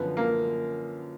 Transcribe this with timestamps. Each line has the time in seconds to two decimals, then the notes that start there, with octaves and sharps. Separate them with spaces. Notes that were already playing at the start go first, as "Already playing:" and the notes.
Already playing: F#2 D3 F3 B3
0.17 A#3